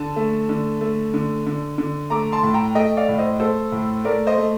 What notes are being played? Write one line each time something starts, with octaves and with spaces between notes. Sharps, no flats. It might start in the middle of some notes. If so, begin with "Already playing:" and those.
Already playing: D3 A5
A3
D3
A3
D3
D3
D3
A3 A#5 D6
A5 C6
A2
G5 A#5
A3 D#5 G5
D5 F5
A2
C5 D#5
A3 A4 C5
A2
A3 A#4 D5
C5 D#5
A3